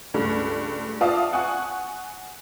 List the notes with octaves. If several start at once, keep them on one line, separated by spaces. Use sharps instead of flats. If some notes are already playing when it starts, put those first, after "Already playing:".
C#2 G2 A3
F4 D5 E5 F5 A5 D#6
F#5 G#5 C#6 F#6